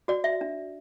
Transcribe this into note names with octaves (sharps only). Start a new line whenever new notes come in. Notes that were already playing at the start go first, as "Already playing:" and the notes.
F#4 D5
E5
D4